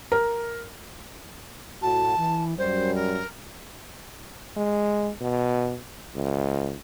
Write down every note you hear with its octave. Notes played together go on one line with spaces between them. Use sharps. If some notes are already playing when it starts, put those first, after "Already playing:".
A#4
A2 F#4 A5
E3
F#2 G3 C5
A#4
G#3
B2
C#2